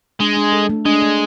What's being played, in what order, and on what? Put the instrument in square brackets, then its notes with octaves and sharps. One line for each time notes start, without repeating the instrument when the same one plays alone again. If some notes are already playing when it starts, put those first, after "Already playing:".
[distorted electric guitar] G#3 [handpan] D4
[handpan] D4
A4
A3
[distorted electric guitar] G#3 [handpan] D4
[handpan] A3